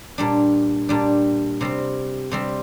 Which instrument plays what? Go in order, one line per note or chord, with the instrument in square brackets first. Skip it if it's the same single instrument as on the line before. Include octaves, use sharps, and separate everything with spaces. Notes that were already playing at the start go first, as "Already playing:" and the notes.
[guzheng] A#2 G3 D4
A#2 G3 D4
C3 G3 C4
C3 G3 C4